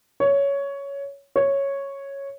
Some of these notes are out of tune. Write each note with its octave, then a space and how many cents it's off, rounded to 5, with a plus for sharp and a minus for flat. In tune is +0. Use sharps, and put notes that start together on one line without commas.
C#5 +10
C#5 -5